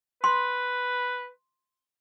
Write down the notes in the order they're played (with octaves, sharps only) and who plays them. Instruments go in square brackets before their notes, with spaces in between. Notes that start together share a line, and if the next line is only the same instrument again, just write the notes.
[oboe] B4 [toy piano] C6